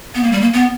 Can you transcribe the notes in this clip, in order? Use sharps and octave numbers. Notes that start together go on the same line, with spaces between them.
B3
A#3
G3
A#3
B3